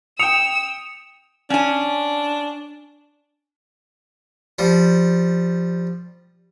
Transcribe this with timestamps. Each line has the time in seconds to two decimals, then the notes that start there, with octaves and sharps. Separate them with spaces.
0.19 G5 D#6 E6 C#7 F7
1.50 C#4 D4 G#5
4.59 F3 G3